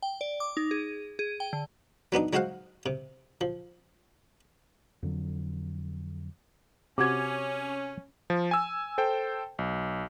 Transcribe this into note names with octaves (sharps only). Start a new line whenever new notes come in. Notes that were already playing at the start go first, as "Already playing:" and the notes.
G5
D5
D6
D#4
G#4
G#4
G5
D3
F#3 B3 D4 D#4
F#3 G#3 F#4 C5 F5 F#5
C3
F3
F2 D3 F#3
C3 C#4 F#4 D6 G#6
F3
G#5 E6
A4 C5 G5
B1